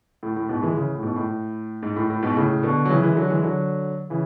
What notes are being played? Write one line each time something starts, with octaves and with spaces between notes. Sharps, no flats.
A2
A2
G#2 B2
E3 G#3
C#3 E3
A2
G#2 B2
A2
G#2
A2
A2
G#2 B2
A2 C#3
B2 D3
F#3
C#3 E3
E3 G#3
D3 F#3
E3 G#3
D3 F#3
C#3 E3